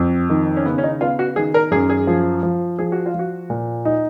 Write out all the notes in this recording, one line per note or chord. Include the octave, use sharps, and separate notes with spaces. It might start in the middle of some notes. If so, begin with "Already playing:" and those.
Already playing: F2
D#3
C#4
C#3 B3
C#4
D#4
B3 F4
F#4
D#3 G#4
A#4
F#2 G#4
G#4
F3
F3
F3 G#4
F#4
F4
F3
F#4
A#2
D#4